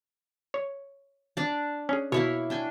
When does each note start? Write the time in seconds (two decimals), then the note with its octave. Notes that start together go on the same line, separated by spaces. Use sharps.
0.54 C#5
1.37 D4 D5
1.89 C#4 G#4
2.12 B2 A#3 E4 C#5
2.50 D4 G5 G#5